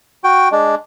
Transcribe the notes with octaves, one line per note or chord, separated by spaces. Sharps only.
F#4 G5
G#3 D4